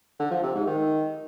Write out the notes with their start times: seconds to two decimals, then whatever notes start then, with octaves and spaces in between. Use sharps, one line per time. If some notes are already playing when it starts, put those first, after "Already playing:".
0.19 D3
0.31 F3
0.43 C3
0.54 G#2
0.66 D#3